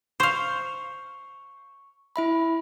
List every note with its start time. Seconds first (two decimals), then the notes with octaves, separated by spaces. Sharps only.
0.20 C5 F5 C#6
2.16 E4 E5 B5